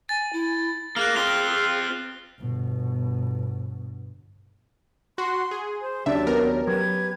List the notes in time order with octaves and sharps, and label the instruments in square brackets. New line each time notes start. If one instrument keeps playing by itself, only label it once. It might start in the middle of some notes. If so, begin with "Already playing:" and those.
[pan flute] G#5 [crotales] A6
[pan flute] E4
[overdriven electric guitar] A#3 [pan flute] G#4 [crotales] F6 F#6
[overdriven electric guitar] C4 F4 [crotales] G7
[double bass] G1 B2
[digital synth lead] F#4 [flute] C6
[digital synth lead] G#4
[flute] C5
[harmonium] D#2 F#3 G4 [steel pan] C#3 D4 [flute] D5 [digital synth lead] E5
[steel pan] B3 [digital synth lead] A#4
[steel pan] F#3 [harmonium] G4 B4 [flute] G#6